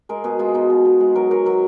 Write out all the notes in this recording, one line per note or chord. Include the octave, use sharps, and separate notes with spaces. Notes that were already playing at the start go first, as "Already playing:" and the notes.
G#3 A#4
B2 G#4
G#3 F4
B2 D#4
B2
B2
G#3
F#3 A#4
F#3 A#4
F#3 A#4